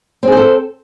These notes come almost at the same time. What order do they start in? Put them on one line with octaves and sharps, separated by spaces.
C4 G#4 C5 A4